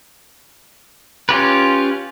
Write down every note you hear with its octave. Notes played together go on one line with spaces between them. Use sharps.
C#4 F4 G4 B4